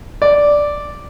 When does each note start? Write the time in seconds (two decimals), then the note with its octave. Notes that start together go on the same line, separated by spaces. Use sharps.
0.22 D5